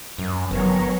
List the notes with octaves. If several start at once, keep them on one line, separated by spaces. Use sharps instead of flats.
F#2
G1 F#3 B3 A#4 C#5